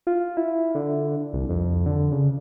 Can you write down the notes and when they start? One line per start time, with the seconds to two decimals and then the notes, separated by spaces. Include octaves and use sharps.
0.07 F4
0.37 E4
0.75 D3
1.33 C2
1.49 F2
1.86 D3
2.11 C#3